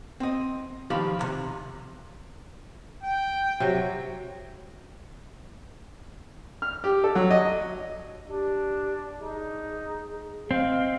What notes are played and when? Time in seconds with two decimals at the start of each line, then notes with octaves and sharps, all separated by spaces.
0.20 C4 D#5
0.90 D#3 F3 G4 F5 B5
1.19 D2 C3
3.03 G5
3.60 C3 F#3
6.62 F6
6.84 G4
7.04 A4
7.15 F#3
7.31 D#5
8.27 D4 G4
9.20 D#4 G#4
10.51 C4 D#5 F5